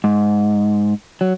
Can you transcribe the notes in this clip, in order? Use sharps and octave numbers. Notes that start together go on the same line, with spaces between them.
G#2
F#3